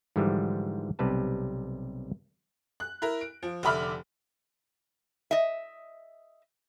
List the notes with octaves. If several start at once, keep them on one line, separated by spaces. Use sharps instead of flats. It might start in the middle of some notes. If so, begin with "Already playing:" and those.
G#2 D3 E3 F3 G3
B1 C3 G3 B4 A5
F#6
E4 A#4
D7
F3
F1 D3 E5 B5 D6 F6
D#5 E5